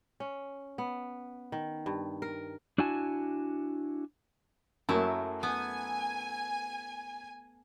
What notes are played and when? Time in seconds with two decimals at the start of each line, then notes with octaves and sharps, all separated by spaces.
0.20 C#4
0.78 B3
1.52 D#3
1.86 G2
2.22 A#4
2.78 D4 E4 F#4 G#5 A5
4.89 F#2 F#3 A3 A#3 E4
5.43 B3 G#5